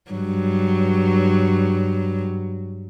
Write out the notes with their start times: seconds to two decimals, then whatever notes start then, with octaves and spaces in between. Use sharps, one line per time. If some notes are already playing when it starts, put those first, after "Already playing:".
0.12 G2 F#3